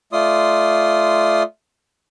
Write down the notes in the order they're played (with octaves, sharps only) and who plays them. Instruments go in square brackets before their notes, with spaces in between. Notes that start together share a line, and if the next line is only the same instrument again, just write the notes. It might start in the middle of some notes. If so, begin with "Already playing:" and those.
[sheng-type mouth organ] A3 F4 D5 C6 D#6